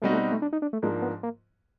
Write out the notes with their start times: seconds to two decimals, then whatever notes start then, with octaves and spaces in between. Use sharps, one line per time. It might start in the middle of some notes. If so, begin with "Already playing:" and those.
0.02 B2 G3 A3 C4 D#4 F#4
0.12 A3
0.32 A3
0.42 D4
0.53 D#4
0.62 D4
0.73 A3
0.82 G#2 F3 G#3 A#3 D4
1.02 B3
1.23 A#3